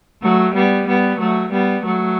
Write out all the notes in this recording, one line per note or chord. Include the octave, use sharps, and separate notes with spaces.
F#3 A3
G3 B3
G3 B3
F#3 A3
G3 B3
F#3 A3